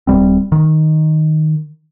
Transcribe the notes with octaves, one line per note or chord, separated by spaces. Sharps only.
D#1 G#2 G3 C4
D#3